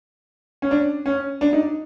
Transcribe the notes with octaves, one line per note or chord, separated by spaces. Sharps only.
C#4
D4
C#4
D4
D#4